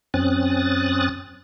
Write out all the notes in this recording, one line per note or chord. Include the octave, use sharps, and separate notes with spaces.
F#2 C4 C#4 D#6 F#6 A6